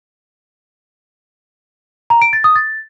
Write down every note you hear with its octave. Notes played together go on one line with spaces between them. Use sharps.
A#5
D7
A6
D#6
A6